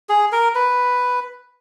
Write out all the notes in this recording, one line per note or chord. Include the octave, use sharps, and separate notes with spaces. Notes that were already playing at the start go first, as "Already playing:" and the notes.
G#4
A#4
B4